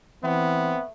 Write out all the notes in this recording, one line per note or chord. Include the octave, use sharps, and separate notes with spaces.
E3 A3 B3 C4